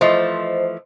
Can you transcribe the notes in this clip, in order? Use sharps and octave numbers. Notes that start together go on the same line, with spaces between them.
E3 F3 A3 C5 D#5 C6